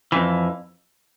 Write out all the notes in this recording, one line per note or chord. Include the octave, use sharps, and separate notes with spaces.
F2 E3